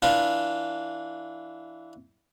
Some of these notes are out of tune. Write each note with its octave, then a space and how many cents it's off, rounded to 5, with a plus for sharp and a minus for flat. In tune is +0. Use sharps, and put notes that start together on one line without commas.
E3 +0 D4 +0 F4 +0